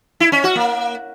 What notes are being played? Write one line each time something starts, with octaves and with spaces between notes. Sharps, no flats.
E4
C#4
F#4
A#3